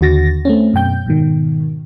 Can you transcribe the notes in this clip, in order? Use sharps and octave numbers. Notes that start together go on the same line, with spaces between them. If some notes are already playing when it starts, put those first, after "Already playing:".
D#2 D3 F#4 A6 A#6
A3 C4 C#4
F#2 B2 G5 G6
G#2 B2 D#3